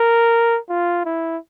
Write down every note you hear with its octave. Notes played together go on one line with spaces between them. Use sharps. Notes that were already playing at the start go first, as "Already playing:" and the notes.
Already playing: A#4
F4
E4